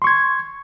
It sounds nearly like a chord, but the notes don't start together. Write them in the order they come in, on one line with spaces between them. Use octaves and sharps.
C6 C#6 G#6